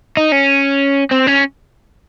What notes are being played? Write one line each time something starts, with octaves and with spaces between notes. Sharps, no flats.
D#4
C#4
C4
C#4